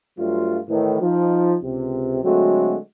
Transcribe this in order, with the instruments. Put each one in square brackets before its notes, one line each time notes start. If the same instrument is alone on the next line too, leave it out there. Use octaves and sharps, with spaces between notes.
[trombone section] G2 F#3 G3 A3 F4
A2 D#3 E3
F3 D#4
C#2 C3
D3 F#3 G#3 A3 C4 F#4